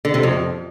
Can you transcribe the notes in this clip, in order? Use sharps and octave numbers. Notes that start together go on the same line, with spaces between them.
D3
C3
F2